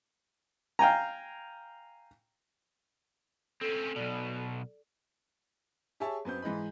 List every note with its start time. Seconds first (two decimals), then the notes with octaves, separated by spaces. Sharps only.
0.79 F5 G5 G#5 A#5
3.61 C4 C#4 A4
3.96 B1 B2 D5
6.00 G4 G#4 C#5 E5 A5
6.25 F#2 B3 C4 G6
6.42 G#2 E3 D#5 B5